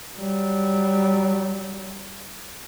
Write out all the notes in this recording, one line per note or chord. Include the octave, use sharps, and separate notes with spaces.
F#3 G3